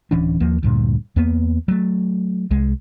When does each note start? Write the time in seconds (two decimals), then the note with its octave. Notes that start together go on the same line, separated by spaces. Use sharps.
0.11 D1 E3 C#4 D4
0.40 D#2 F3 A#3
0.63 D2 G2 A#2
1.16 E2 A#3 B3
1.68 F#3 A3
2.51 C2 G#3